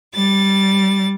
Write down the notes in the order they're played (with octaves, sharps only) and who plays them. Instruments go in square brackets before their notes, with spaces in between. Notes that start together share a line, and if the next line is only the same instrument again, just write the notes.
[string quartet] G3 A6